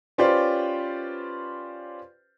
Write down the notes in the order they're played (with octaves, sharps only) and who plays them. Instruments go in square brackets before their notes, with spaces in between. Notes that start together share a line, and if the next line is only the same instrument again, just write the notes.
[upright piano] C#4 F4 G4 B4 C5 D5